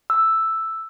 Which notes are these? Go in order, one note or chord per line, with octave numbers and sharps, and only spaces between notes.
E6